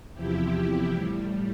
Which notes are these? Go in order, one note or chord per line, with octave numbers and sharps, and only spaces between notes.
E2 C3 F3 E4 G4
A2 G3